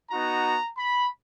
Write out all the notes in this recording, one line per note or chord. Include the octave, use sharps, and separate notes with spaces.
B3 D#4 F#4 A#5
B5